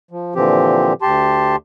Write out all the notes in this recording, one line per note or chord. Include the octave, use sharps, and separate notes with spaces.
F3
A#2 D3 E3 F3 C4 G4
D2 G4 A5 C6